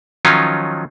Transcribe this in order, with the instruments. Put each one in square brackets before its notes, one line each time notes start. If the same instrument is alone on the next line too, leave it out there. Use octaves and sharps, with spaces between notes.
[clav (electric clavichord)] D#3 F3 F#3 C#4 D#4 F4